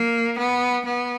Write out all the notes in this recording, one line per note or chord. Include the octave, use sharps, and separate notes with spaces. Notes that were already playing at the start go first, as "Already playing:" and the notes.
Already playing: A#3
B3
B3